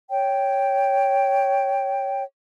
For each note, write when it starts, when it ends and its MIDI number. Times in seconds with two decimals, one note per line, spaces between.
0.10 2.23 73
0.10 2.23 79